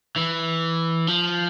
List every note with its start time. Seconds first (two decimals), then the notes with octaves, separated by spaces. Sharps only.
0.16 E3
1.07 F3